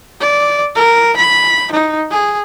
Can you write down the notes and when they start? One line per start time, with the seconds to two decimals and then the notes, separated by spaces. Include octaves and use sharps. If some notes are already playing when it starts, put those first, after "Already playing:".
0.20 D5
0.76 A#4
1.16 B5
1.72 D#4
2.11 G#4